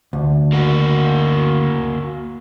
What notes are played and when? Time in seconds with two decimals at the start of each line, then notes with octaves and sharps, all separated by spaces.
0.13 D2
0.53 A#3 F#4